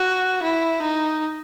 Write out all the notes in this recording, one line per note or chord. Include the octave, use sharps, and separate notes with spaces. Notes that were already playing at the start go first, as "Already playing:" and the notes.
Already playing: F#4
E4
D#4